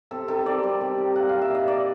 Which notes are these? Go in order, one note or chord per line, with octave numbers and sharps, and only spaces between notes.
C3 A4
D#3 A4
C3 D5
G3
C3
D#3
A#2 F#5
G3 F5
E5
A#2 D#5
A#3 D5